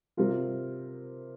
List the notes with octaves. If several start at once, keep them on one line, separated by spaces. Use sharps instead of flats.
C3 G3 C4 F4 A#4